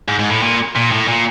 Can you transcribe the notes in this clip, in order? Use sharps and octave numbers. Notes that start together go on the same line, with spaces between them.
G#2
G#2
A2
A#2
A#2
A2
A#2